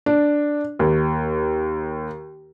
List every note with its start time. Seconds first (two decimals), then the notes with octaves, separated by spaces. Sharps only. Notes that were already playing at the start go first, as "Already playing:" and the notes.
0.06 D4
0.79 D#2